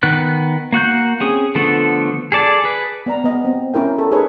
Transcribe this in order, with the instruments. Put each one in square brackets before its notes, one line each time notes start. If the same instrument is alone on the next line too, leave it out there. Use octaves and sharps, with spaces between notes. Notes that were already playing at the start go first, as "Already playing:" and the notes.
[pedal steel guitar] D#3 B3 F#6
A#3 F#4 F#6 G6
C4 C#4 G#4
D3 F3 A3 B3 A4
G#4 A4 D5 A5
G#4 B4
[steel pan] B3 D5 A#5
B3 D#5
C4
C#4 E4 A#4 G5
A4
D#4 G#4 A#4 B4 C#5